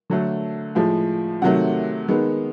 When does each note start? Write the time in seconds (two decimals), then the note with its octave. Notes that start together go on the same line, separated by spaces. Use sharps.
0.10 D3 F#3 A3
0.75 A2 F3 G#3
1.42 C3 D#3 F#3 A3 F#5
2.08 D#3 G#3 B3